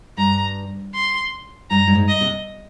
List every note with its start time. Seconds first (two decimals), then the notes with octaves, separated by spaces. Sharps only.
0.17 G2 A#5
0.94 C6
1.70 G2 A#5
1.87 G2
1.95 G#2
2.08 D#5
2.21 C3